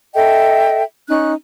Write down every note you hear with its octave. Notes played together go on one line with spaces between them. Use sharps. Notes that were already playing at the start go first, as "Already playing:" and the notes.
A4 D#5 E5 G5
C#4 D#4 F#6